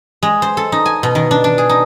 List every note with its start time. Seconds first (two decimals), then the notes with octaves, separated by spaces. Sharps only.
0.23 G#3
0.42 C5
0.57 A4
0.72 D#4
0.86 G#5
1.03 B2
1.15 D#3
1.31 D4
1.44 D4
1.58 G#4
1.69 D#4